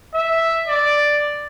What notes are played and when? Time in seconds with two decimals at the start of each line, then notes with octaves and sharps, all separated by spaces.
0.14 E5
0.68 D5